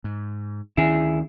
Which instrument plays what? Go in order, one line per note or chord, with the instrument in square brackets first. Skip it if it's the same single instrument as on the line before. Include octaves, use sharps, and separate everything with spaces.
[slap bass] G#2
[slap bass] D2 D#3 C#4 [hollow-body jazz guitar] E4 G#4